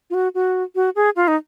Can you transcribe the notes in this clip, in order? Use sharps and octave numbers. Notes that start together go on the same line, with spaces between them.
F4
F#4
F#4
F#4
G#4
F4
D#4